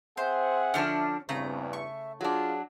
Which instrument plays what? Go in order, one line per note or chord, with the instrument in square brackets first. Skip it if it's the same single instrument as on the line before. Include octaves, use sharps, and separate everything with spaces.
[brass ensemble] C4 G#4 F#5 [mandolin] C5 [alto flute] E5
[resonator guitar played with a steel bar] D3 F3 D4 [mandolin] C#4 F6
[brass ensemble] E2 G2 [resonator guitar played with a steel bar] C#3 A3 [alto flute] C4 [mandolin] A#5
[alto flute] E5 [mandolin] C#6
[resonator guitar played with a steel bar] F#3 D4 [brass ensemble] F4 [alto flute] G#4